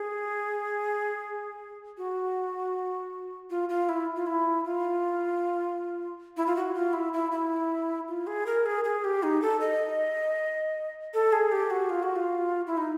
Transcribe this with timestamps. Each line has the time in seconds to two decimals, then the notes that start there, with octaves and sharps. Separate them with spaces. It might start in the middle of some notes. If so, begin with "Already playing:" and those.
Already playing: G#4
1.98 F#4
3.50 F4
3.69 F4
3.89 E4
4.16 F4
4.27 E4
4.65 F4
6.37 E4
6.47 F4
6.56 F#4
6.75 F4
6.93 E4
7.13 E4
7.32 E4
8.08 F4
8.27 G#4
8.46 A#4
8.66 G#4
8.84 G#4
9.04 G4
9.23 D#4
9.42 A4
9.61 D#5
11.14 A4
11.33 G#4
11.52 G4
11.70 F#4
11.90 F4
12.03 F#4
12.16 F4
12.67 E4
12.77 D#4